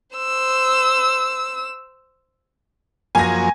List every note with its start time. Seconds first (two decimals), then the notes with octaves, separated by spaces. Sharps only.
0.16 C5 E6
3.15 F#2 F3 A#3 G#5 A#6